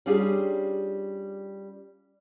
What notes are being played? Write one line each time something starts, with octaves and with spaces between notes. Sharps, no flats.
G3 C#4 D4 F4 G4 G#4